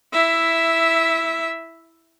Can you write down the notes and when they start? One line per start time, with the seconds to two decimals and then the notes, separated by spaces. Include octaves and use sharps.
0.13 E4 E5